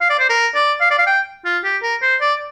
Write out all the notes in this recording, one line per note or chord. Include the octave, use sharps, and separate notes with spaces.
F5
D5
C5
A#4
D5
F5
D5
F5
G5
F4
G4
A#4
C5
D5